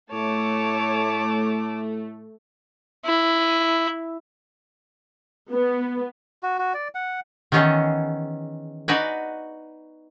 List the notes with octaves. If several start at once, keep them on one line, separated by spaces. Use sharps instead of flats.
A2 A3 C#5 A5 D6
E4
B3
F#4
F#4
D5
F#5
D#3 E3 B3 C#4 D#4 G#4
D#4 F#4 B4 D5 G#5